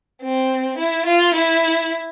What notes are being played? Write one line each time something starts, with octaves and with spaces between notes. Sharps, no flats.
C4
E4
F4
E4